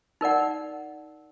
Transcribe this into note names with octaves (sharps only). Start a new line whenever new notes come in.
D#4 A#4 D5 F#5